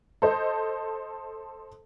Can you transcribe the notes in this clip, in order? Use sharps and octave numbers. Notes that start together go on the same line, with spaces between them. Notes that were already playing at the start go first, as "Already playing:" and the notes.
A4 C5 D#5